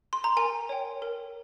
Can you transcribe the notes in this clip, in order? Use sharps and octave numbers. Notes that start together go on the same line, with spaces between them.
C6
A#5
A#4 G#5
C#5 G5
A#4